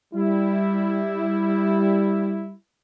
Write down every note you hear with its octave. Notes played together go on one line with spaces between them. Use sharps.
G3 E4